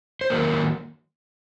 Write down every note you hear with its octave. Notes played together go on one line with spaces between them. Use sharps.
C5
D#3 F#3 A#3 A#4